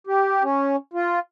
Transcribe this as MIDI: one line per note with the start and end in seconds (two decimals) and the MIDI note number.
0.07 0.43 67
0.43 0.76 61
0.93 1.19 65